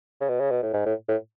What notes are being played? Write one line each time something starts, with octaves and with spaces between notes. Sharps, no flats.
C#3
B2
C#3
B2
A2
G#2
A2
A2